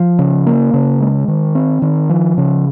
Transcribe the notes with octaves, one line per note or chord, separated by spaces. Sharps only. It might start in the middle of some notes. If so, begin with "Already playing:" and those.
Already playing: F3
C#3
A#3
C#3
G#3
D#3
C4
D#3
F3
C#3